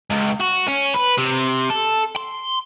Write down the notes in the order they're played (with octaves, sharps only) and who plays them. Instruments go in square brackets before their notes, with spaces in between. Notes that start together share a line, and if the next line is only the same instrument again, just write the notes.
[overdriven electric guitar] C#2
F#4
C#4
B4
C3
A4
C6